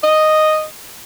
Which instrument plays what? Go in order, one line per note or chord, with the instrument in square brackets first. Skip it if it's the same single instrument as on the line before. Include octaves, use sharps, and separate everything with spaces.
[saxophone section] D#5